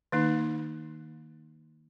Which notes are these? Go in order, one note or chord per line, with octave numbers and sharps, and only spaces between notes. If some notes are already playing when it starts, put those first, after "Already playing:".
D#3 A#3 D#4